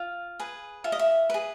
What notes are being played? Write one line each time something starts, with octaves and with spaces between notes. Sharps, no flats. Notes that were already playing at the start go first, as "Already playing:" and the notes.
Already playing: F4
G#4 B4
F4 E5
D#5
E5
G#4 B4